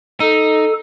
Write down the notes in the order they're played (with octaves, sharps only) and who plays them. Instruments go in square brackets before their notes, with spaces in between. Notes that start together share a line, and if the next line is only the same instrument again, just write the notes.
[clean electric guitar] D#4 [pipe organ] A4